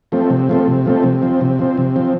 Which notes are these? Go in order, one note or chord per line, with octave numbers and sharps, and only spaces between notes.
F3 A3 C4
C3
F3 A3 C4
C3
F3 A3 C4
C3
F3 C4
C3
F3 C4
C3
F3 C4